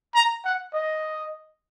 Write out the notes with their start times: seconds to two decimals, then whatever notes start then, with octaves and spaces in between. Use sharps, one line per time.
0.15 A#5
0.45 F#5
0.73 D#5